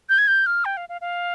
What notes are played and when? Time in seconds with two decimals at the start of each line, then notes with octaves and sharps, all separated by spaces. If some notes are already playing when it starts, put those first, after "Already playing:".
0.09 G6
0.18 G#6
0.28 G6
0.46 F6
0.65 G5
0.77 F5
0.89 F5
1.01 F5